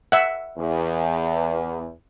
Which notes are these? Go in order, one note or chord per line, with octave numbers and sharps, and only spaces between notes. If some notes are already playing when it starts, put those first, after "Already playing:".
E5 F#5
E2